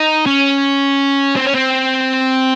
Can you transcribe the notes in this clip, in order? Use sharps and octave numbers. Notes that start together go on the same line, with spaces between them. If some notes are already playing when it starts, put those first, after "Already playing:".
Already playing: D#4
C#4
C4
C#4
C4